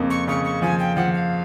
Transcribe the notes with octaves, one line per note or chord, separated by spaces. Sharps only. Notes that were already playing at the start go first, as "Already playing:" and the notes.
Already playing: F2 C#3 A#3
C#6
C#3 C#6
C#6
F3 G#5
G5
F3 F#5
F5